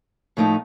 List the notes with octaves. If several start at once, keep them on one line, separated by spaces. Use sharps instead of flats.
A2 F3 A3 D#4